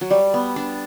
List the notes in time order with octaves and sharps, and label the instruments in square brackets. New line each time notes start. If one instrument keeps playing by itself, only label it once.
[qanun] F#3
[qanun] G3 [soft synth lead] D5
[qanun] B3
D4